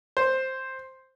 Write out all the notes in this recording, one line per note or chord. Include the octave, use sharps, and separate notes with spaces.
C5